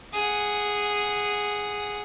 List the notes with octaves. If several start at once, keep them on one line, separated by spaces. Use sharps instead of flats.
G#4 F#5